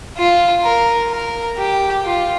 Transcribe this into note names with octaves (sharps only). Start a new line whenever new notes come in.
F4
A#4
A#4
G4
F4